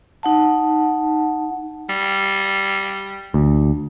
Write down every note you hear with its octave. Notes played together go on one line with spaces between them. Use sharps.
D#4 F#5 A5
G3
D2